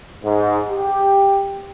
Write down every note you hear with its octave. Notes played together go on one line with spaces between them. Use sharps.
G#2
G4